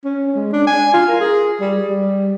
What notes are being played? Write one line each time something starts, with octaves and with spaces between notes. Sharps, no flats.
C#4
G#3
D4
G#5
F4
A#4
G#4
G3
G3